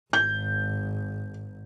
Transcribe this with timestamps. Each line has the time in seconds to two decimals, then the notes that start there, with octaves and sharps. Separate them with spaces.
0.13 G#1 G6